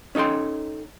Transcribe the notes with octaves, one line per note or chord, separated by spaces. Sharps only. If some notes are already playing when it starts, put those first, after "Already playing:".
C#4 D#4 A4 G5 C6